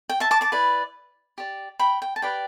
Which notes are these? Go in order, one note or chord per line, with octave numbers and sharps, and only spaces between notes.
G5
E5 A5
A5 D6
A5 D6
E4 B4 D5
G4 D5
G5 B5
G5
A5
G4 B4 D5 G5